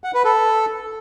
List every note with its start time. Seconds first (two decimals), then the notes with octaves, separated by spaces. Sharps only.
0.04 F#5
0.14 B4
0.25 A4